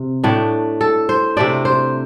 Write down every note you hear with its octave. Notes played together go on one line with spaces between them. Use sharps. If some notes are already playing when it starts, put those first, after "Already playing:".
Already playing: C3
A2 A3 D4
A4
C5
C3 A3 D4 D5
C5